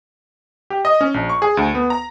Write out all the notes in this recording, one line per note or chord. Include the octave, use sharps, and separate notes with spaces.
G4
D#5
C#4
A#1
C#6
G#4
D2
B3
A#5